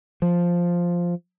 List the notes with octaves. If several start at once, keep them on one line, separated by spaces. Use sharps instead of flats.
F3